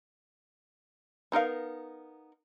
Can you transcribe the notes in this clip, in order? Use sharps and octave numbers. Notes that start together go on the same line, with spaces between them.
B3 D#4 A#4 F5